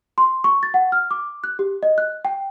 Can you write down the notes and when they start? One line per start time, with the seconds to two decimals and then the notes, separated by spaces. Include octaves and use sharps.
0.18 C6
0.44 C#6
0.63 A6
0.74 F#5
0.92 F6
1.11 D6
1.44 F#6
1.59 G4
1.83 D#5
1.98 F#6
2.25 G5